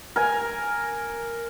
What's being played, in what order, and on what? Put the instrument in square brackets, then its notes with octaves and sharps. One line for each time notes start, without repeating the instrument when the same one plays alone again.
[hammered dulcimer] A#4 G#5